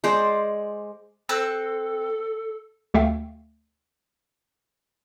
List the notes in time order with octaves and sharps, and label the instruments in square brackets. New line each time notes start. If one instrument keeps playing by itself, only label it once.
[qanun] G#3 C5 D5
[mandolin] C4 E6 F#6 [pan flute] A4
[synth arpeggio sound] D2 A3 E5 F5 G5